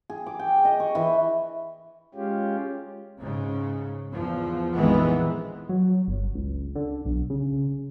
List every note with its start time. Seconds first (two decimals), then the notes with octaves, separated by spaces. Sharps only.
0.10 G#4
0.26 D6
0.39 G5
0.65 D#5
0.80 C#6
0.95 E3
2.15 G#3 C#4 F4 G4
3.18 G#2 C#3
4.12 E2 F3
4.75 A#1 F2 D#3 E3 G#3 B3
5.69 F#3
6.08 G1
6.35 C#2
6.76 D3
7.05 B1
7.30 C#3